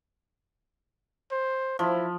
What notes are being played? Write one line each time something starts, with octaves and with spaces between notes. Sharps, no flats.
C5
F3 E4